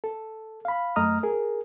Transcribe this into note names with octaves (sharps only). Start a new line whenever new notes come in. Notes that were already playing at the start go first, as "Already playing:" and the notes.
A4
F5 B5
F#2 A3 D#5 A#5 D#6 F6
G#4 A#4